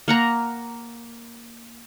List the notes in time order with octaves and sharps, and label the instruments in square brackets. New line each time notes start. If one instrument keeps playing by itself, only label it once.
[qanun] A#3 F#5 A#5